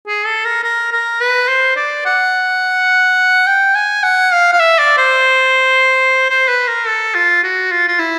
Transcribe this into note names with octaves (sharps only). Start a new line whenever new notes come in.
G#4
A4
A#4
A#4
A#4
B4
C5
D5
F#5
G5
G#5
F#5
F5
F5
E5
D5
C5
C5
B4
A#4
A4
F4
F#4
F4
F4
E4